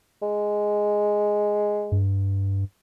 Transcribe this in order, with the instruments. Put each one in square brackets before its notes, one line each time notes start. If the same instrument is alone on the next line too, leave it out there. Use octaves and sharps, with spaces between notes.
[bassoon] G#3
[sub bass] G2